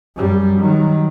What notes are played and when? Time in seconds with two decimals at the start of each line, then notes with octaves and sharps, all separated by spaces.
0.16 F#2 G3
0.59 D#3 F#3